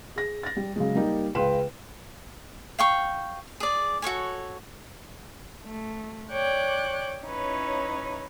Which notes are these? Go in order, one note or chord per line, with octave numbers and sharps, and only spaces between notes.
G#4 A#6
A6 A#6
G3
C#3 F#3 G#3
G3 A#3 D#4 G4
C#2 C#3 B4 G5 C6 E7
F5 G5 C#6
G#4 D5
F#4 A4 C#5 G#5
A3
C#5 D5 G5 D6 F#6
C#4 D#4 E4 B4 C#5